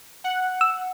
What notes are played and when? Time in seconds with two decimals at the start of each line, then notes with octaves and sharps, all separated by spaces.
0.24 F#5
0.61 E6